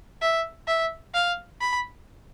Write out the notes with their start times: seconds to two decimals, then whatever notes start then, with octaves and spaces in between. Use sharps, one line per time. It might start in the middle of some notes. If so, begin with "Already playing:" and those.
0.22 E5
0.68 E5
1.14 F5
1.61 B5